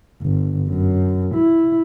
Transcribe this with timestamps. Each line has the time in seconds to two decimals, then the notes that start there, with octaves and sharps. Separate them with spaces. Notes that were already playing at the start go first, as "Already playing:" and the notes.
0.22 G1
0.69 F#2
1.34 E4